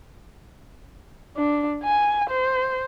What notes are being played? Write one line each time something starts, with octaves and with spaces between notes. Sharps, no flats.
D4
G#5
C5